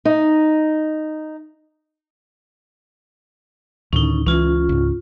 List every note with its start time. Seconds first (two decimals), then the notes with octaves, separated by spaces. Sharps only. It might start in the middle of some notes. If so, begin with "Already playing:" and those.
0.05 D#4
3.93 D2 A2 D#3 C#4 D#4
4.27 C#2 E3 C#4 F4
4.69 C#2 G#2